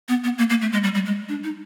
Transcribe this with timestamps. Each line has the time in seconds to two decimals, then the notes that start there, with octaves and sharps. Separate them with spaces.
0.09 B3
0.24 B3
0.38 A#3
0.50 A#3
0.62 A3
0.73 G#3
0.83 G3
0.95 G3
1.06 G#3
1.29 D4
1.44 D#4